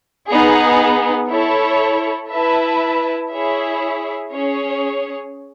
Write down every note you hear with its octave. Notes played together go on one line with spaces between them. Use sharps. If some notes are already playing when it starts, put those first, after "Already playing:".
B3 D#4 G#4
E4 A4 C#5
E4 B4 E5 A5
E4 G#4 C#5 E5
C#4 G#4 C#5